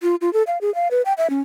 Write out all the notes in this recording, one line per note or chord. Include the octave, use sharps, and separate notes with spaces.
F4
F4
A4
F5
G#4
F5
B4
G5
E5
C#4